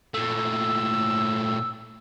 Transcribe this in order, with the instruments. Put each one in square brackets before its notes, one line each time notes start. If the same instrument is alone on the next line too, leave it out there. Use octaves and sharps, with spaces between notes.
[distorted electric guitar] A#2 A3 [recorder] E6